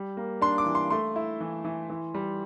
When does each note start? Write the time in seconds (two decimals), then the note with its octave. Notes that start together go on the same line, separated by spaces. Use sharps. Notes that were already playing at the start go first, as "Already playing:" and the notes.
Already playing: G3
0.17 A#3
0.42 D4 C6
0.58 D6
0.66 E3
0.75 C6
0.90 A3 C6
1.16 E4
1.40 E3
1.65 E3
1.90 E3
2.14 G3